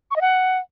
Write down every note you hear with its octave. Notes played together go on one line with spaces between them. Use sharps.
C#6
D#5
F#5